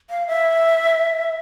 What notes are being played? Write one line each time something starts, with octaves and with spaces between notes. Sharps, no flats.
F5
E5